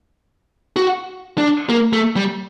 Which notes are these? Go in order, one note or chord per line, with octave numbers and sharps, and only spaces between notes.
F#4
D4
A#3
A3
G3